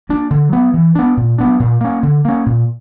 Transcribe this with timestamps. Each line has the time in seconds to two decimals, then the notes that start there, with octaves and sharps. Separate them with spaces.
0.09 A#3 D4
0.30 D3
0.52 F#3 B3
0.74 E3
0.95 B3 D4
1.17 A#2
1.38 F#3 B3 D4
1.60 A#2
1.81 A#3 C#4
2.03 D3
2.25 A#3 C#4
2.46 A#2